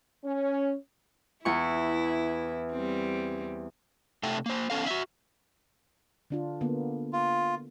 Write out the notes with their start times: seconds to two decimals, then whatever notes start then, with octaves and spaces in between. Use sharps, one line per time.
0.25 C#4
1.45 E2 E4 C#6
2.72 G3 C4
4.23 C3 A3 A4 E5 G5
4.46 A#3 C5
4.70 B3 C#4 A4 F5
4.86 F#4 E5
6.30 D3 D4 F4
6.61 D3 A#3 B3
7.13 F4